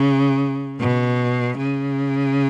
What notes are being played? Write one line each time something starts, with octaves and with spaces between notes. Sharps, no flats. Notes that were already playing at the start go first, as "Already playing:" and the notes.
Already playing: C#3
B2
C#3